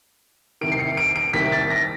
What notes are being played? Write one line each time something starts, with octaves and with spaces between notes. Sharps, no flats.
C2 C3 D#3 D7
C7
C#7
D7
D7
C2 C3 D#3 B6
A6
A#6